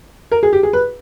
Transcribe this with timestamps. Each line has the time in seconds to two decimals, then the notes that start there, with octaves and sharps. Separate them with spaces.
0.31 A#4
0.43 G#4
0.53 G4
0.63 G#4
0.73 B4